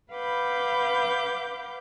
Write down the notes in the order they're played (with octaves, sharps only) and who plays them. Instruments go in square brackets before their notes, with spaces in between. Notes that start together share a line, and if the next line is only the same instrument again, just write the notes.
[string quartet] B4 F5 F#5 B5 D6 G6